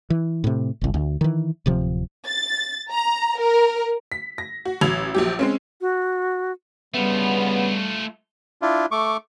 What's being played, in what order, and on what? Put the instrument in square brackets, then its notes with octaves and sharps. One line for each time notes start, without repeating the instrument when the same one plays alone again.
[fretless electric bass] E3
A2 C3
G1 C2
D2
D#3 E3
D1 C3 F3
[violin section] A6
A#5
A#4
[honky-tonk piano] B6
A#6
F#4
A1 F#3 E6 G#6 F7
A#1 F#3 G4
G#3 C4 C#4
[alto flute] F#4
[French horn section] G2 C#3 B3 [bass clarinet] G3 [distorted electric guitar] A3 F4
[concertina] D4 E4 F4
A3 C#6 D6